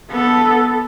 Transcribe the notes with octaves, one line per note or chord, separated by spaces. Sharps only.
B3 A4